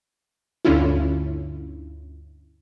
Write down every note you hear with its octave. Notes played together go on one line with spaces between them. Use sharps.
D2 G2 D3 C#4 E4 F4